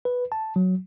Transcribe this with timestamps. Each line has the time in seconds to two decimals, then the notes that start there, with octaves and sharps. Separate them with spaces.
0.05 B4
0.32 A5
0.56 F#3